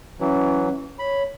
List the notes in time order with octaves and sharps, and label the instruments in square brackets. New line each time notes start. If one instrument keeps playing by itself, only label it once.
[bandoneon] E3 F#3 [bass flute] C#4
[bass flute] C#5 [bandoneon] B5